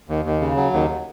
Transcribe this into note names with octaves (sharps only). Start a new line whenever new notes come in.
D#2
D#2
C#3
F#3
D#2